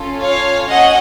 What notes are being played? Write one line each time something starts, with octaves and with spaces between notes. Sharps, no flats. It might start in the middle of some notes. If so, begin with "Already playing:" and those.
Already playing: C#4 F4 A4
C#5 F5
C#4 F#4 A4 D#5 F#5